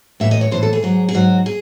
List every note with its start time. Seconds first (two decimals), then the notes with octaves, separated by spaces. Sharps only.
0.20 A2 E3 E5
0.31 D#5
0.41 C#5
0.51 A2 E3 C5
0.63 A4
0.73 G#4
0.83 G#2 F#3
1.09 G#4
1.14 G#2 F#3 F#4
1.46 G#4